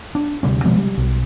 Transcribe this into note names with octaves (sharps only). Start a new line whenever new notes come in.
D4
D2 C3 G3 C#4
B2 F3 G#3 C4
G3
B1